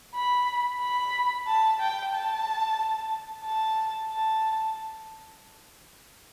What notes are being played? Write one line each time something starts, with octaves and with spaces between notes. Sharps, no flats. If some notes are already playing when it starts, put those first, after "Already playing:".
B5
B5
A5
G5
A5
A5
A5